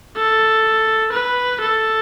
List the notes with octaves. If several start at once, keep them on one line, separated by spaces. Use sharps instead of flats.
A4
B4
A4